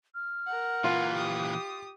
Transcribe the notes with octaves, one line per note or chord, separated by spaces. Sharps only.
F6
A#4 F#5
A#2 E3 F4
G4 D#6